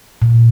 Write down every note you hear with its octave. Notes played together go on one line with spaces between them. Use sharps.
A#2